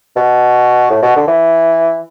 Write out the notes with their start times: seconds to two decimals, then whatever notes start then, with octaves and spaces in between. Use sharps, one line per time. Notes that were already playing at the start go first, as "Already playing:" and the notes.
0.16 B2
0.90 A2
1.02 B2
1.16 D3
1.28 E3